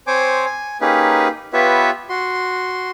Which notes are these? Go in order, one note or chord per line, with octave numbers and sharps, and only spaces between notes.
C4 C5 C#5 G#5 D6
G#5
A#3 C#4 D#4 G4 G#4 B4
B3 F4 G4 B4 C#5 E5
F#4 C6